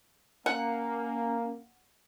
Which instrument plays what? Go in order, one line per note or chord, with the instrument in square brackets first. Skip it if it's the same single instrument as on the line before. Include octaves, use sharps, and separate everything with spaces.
[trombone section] A#3 [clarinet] C#4 [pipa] F#5